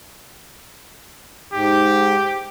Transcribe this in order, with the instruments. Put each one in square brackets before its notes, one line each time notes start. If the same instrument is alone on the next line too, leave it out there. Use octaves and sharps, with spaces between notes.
[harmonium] G#2 [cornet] G4